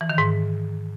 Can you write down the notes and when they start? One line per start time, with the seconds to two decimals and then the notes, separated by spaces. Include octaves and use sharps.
0.01 E3
0.09 D#3
0.18 G#2